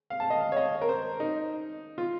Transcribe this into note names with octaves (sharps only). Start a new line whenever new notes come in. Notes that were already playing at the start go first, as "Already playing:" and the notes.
F5
A5
D#5
F5
C#5
D#5
A#4
C5
D#4
F4